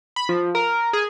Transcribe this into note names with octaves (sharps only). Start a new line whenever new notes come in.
B5
F3
A#4
G#4